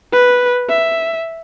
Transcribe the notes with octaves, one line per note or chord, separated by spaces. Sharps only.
B4
E5